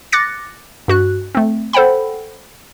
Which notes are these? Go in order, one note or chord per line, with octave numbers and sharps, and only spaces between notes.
D6 F#6 A6 A#6 C#7
G2 F#4 F#6
A3 C4
A4 C5 F#5 G5 B5